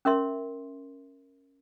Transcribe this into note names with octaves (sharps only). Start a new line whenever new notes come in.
C#4 A#4 E5 C6